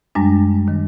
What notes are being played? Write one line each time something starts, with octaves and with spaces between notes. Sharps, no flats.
F#2 G3 G#3 D4
D#3